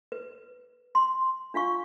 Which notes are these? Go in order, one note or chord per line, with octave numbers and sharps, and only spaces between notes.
B4
C6
D4 F4 F5 C#6